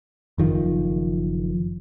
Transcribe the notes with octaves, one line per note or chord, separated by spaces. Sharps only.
F#1 D#3 F3